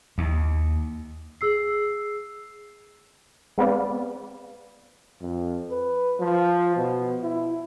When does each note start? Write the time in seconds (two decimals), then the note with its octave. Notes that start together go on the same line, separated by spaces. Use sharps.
0.18 D#2
1.41 G#4 E6 C7
3.58 G#3 B3 C4 B4 D5 F5
5.22 F2
5.70 B4
6.19 F3
6.76 B2
7.23 E4